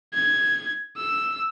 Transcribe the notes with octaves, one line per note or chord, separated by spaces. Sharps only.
G#6
E6